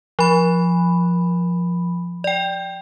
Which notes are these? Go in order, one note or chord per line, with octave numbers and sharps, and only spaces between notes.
F3 B5
D5 G5